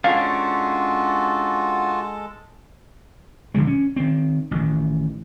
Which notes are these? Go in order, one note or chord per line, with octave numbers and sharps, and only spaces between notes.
G#3 C#4 D4 F4 F#4 A4 F5
D#1 D3 F3 G#3
C#4
D#3 C4
A1 D#3